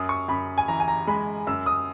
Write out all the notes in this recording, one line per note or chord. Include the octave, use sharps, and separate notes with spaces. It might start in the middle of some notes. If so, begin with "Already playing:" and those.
Already playing: F#2 D#6
C#6
F#2 B5
G#5
E3 A#5
G#5
A#5
G#3 B5
F#2 E6
D#6